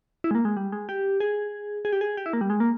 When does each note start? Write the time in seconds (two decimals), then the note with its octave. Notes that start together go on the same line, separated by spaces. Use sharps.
0.24 E4
0.31 G#3
0.35 A#3
0.45 G#3
0.57 G3
0.72 G#3
0.89 G4
1.20 G#4
1.85 G#4
1.93 G4
2.01 G#4
2.17 G4
2.26 E4
2.33 A#3
2.41 G3
2.50 G#3
2.60 A#3